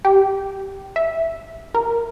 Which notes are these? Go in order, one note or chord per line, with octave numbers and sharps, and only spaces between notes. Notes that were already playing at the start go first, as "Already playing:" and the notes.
G4
E5
A#4